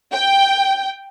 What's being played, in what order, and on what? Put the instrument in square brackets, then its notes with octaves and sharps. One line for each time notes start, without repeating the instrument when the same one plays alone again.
[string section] G5